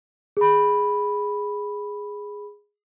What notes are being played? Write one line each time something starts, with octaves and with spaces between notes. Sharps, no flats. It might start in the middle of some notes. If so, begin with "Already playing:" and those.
G#4 B5